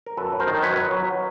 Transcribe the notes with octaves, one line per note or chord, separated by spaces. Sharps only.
A#4
F#2 A4 B4
F#2
A#4 C5
D#3
F#2 B4 C#5
F#3
F#3